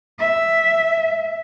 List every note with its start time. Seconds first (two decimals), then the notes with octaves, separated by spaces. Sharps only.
0.19 E5